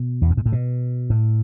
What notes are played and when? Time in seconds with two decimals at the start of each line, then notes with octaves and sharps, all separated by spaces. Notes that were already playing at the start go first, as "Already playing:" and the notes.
Already playing: B2
0.22 E2
0.30 F#2
0.37 G#2
0.46 A2
0.52 B2
1.10 A2